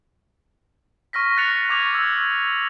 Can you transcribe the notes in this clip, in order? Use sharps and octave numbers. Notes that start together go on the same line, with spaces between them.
C#6 F6 A#6 B6
F#6 A6 C#7 F7
C#6 D6 G#6 F7
E6 G#6